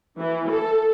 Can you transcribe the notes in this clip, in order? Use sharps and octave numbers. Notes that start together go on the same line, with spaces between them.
E3
A4